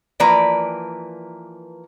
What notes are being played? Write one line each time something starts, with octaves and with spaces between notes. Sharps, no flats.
E3 F3 A#3 B4 D5 A#5